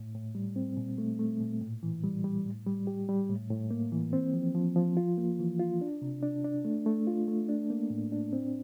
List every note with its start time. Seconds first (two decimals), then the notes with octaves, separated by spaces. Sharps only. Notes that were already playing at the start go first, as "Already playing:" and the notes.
Already playing: A2
0.15 A2
0.35 G3
0.56 C4
0.77 A#2
0.98 A3
1.19 A3
1.40 A#2
1.61 A2
1.83 E3
2.03 G3
2.24 G3
2.45 A2
2.67 G3
2.87 G4
3.09 G3
3.29 A2
3.50 A2
3.71 A#3
3.92 E3
4.13 C4
4.34 F3
4.55 F3
4.76 F3
4.97 F4
5.18 A#3
5.39 E3
5.60 F4
5.81 D4
6.02 C3
6.22 D4
6.44 D4
6.65 A3
6.86 A3
7.07 F4
7.28 A3
7.49 D4
7.70 A#3
7.90 A2
8.12 D4
8.33 C4